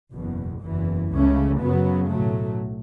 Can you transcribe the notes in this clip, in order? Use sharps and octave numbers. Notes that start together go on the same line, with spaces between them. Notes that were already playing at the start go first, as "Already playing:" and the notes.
F#1 E2 B2
F#1 E2 E3
C#2 C#3 A3 C#4
F#2 C#3 F#3 B3
B1 A2 F#3 A3